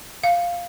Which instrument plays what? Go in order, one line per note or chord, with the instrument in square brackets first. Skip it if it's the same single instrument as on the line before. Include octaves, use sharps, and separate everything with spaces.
[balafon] F5